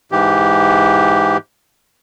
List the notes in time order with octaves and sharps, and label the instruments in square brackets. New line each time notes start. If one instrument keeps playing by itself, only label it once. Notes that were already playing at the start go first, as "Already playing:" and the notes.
[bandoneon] G#2 E3 G4